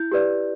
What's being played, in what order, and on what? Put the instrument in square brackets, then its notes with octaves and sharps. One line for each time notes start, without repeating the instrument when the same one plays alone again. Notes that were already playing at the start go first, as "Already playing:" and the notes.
Already playing: [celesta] E4 G6
G4 B4 D5